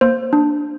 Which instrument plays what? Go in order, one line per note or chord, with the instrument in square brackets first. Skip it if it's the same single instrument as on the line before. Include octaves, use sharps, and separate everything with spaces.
[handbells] A#3 C5
D4